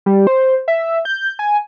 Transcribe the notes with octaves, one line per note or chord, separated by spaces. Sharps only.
G3
C5
E5
G6
G#5